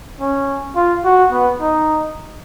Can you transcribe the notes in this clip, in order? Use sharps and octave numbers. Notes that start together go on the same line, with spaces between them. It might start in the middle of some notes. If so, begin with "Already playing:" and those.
C#4
F4
F#4
B3
D#4